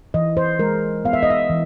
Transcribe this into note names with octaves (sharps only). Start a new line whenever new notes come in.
E3 D#5
C5
G#3 A#4
B3 F5
E5
D#5
E5
E3